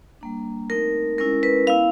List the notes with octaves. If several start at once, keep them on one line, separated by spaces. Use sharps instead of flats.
G3 A#3 D4
A3 C4 D#4 A#4
G#3 C#4 E4 A#4
B4
B3 E4 F5